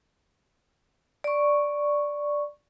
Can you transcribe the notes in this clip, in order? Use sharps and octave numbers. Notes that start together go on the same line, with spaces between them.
D5 C#6